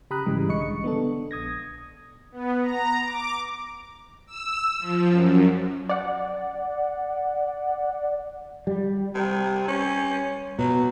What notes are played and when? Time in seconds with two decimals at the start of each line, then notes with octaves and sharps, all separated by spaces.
0.10 C#3 G4 A#5 B5 D#6 F#6
0.26 G#1 G#2 C#3 E3 G3 G#3
0.48 B1 D3 D#5 C#6 C#7
0.84 B3 D4 A4
1.31 A#1 D#6 G#6 A#6
2.32 B3
2.62 A#5
3.03 D6
4.26 E6
4.79 F3
5.09 F#2
5.89 D5 F#5
8.67 G3
9.15 C3
9.68 C#4
10.59 B2 F#3